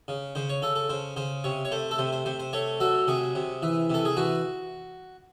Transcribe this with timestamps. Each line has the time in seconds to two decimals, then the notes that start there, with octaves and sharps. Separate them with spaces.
0.08 C#3
0.35 C#3 C5
0.49 C#5
0.62 C#3 A4
0.76 A4
0.89 C#3 C5
1.16 C#3 C5
1.44 C3 C#5
1.65 C#5
1.71 A3 C5
1.91 A4
1.98 C3 C5
2.12 C5
2.25 C3 C5
2.40 C5
2.53 A3 C#5
2.80 F#3 A4
3.07 C3 G#4
3.35 C3
3.62 E3
3.90 C3 A4
4.05 G#4
4.17 E3 F#4